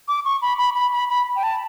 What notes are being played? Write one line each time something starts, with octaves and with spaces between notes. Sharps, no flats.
D6
C#6
B5
B5
B5
B5
B5
G5
A5